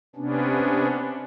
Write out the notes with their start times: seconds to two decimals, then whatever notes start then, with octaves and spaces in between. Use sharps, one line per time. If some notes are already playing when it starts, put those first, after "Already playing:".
0.16 C3 B3 C#4 D4